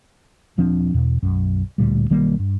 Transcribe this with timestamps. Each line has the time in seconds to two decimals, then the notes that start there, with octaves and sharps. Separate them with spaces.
0.58 D#1 F3 C4 D4
0.94 E2 B2
1.22 B1 F#2
1.78 D1 D2 A#2 G3
2.10 B1 D#3 G3 A#3
2.39 G2